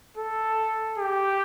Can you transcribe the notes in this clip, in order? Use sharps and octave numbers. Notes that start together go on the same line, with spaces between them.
A4
G4